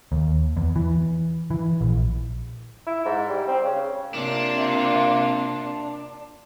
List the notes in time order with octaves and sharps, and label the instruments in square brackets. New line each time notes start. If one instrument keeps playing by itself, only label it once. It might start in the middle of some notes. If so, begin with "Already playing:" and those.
[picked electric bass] D#2
E2
E3
E3
A#1
[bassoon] E4
G#2
G3
C4
C#3
[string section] C3 [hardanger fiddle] A#3 F4 [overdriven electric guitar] D4